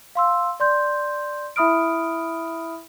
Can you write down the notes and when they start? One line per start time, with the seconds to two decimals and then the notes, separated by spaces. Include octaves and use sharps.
0.15 F5 C6 E6
0.60 D5 C6 G6
1.56 E4 E5 B5 D#6 F6 D7